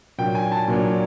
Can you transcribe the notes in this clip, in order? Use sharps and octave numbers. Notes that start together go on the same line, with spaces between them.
A#2 F#3 A#3 D4 G5
G#5
A5
A#2 F#3 A#3 D4